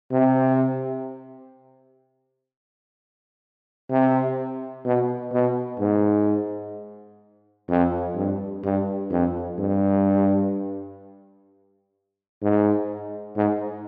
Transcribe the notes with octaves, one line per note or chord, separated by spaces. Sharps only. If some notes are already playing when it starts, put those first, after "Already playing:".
C3
C3
B2
B2
G#2
F2
G2
G2
F2
G2
G#2
G#2